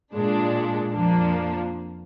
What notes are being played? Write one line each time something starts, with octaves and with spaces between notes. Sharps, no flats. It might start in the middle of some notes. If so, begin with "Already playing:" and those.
A#2 G#3 D4
F2 F3 A#3 D4